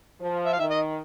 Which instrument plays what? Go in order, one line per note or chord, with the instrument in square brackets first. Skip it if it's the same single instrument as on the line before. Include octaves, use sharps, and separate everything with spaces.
[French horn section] F3
[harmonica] E5
F5
[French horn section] D#3 [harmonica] E5
[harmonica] D#5